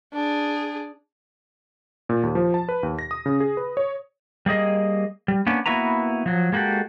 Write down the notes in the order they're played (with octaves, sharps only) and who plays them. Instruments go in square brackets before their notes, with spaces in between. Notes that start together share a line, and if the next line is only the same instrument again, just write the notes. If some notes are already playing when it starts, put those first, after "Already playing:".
[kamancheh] D4 G#4
[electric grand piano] A#2
D#2
F3
A5
B4
D#2
A#6
D#6
C#3
G#4
B4
C#5
[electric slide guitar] G3 A#3 G#4 D#5
G3
A#3 B3 C#4 D4
A#3 B3 E4 F#4 B4 A#5
F3 F#3
G#3 A#3 F#4 G4 A4